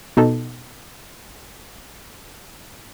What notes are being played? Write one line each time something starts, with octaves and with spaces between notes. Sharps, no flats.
B2 D#4 A4